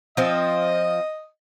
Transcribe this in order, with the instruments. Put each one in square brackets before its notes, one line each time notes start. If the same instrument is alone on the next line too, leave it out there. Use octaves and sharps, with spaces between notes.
[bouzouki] F3 C4 [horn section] D#5